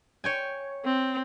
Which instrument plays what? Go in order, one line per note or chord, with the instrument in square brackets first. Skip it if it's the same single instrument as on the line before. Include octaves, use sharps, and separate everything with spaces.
[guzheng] C#5 G5 G#5
[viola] C4